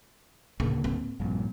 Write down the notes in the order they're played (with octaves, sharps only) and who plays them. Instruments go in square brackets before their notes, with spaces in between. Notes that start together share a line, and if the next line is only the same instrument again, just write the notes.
[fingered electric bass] D2 A2 A#3 [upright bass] C#3
[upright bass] C4
[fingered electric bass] A#1 G2 A#2